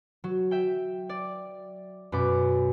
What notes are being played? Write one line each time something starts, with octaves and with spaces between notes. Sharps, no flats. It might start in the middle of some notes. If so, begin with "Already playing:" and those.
F#3
E5 G5
D5
F#2 B2 B4 D6